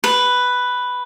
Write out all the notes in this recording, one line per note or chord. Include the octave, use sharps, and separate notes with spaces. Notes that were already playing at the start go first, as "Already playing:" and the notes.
B4